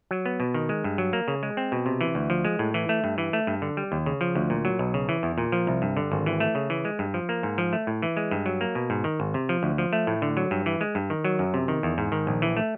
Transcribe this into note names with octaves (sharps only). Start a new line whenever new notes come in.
F#3
B3
B2
D#3
G#3
G2
F#3
A#3
C#3
G#3
C4
B2
C3
E3
D2
F3
G#3
A2
E3
A3
G2
E3
A3
G2
D3
G3
D#2
C#3
F3
D2
A#2
F#3
B1
C#3
E3
E2
A#2
F3
C2
G2
D3
G#1
E3
A3
C#3
E3
G#3
G2
F3
A#3
G#2
F3
A3
A2
E3
G#3
G2
F#3
A#3
B2
G#2
D#3
G#1
C3
F3
D2
F3
A3
A2
D3
F#3
G2
E3
G#3
G2
D#3
F#3
F#2
C3
D#3
E2
G#2
D#3
A#1
E3
A3